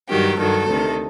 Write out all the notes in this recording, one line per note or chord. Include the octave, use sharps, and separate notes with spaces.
G2 D#3 F#3 G4
G2 D#3 F#3 A4
D2 C3 D#3